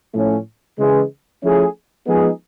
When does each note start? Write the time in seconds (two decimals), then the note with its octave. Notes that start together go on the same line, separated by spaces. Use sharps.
0.14 A2 F3 A3 C#4
0.78 C#3 E3 G#3
1.43 F3 A3 C#4 E4 G#4
2.07 F3 G#3 B3 D#4 G#4